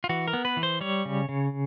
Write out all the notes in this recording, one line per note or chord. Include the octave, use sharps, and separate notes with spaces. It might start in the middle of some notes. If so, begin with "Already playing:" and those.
F4
E3 F#4
A#4
B3
B4
E3
C5
G3 C#5
C#3
C#3